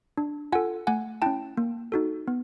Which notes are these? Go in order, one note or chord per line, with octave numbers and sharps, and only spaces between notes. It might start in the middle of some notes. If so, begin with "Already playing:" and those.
D4
F4 A4 F#5 G#5
A3 F#5 G#5
C#4 E4 G5 A5
A#3
D#4 F#4 A4
B3